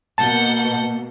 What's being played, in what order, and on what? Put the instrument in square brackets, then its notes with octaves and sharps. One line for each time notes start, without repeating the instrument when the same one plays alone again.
[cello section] B2 A#3 [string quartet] F#5 G6 [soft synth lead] A5